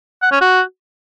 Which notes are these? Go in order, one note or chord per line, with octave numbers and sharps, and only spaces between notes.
F#5
C#4
F#4